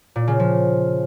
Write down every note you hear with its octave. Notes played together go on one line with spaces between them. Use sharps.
A#2
C#3
F3